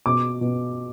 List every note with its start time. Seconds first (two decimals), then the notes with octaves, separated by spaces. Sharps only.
0.06 B2 D6
0.41 B2